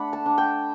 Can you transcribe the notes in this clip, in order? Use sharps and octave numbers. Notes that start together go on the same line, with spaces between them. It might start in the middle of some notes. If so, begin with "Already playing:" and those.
Already playing: A3 D4 F#5 B5
A5
D4
G5